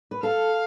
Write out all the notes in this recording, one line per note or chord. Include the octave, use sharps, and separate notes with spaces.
B4
A4 F5